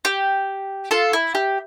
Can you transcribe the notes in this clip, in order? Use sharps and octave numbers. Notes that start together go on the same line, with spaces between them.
G4
F4 A4
E4
G4